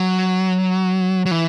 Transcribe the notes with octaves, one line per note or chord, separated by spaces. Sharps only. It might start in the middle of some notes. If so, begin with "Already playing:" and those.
Already playing: F#3
F#3
E3